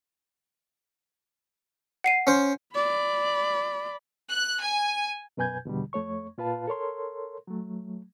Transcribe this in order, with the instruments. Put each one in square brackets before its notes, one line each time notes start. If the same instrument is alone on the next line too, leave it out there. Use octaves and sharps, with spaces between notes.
[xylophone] F#5 C7 D#7
[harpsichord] C#4 C5
[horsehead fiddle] D5 B5
[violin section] F#6
G#5
[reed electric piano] F#2 B2 B4 G#5 G6 G#6
E2 B2 D3 G3
F2 A3 C#5 C#6
A#2 F4 B4 F5 A5
A4 A#4 C#5 C6
F#3 A3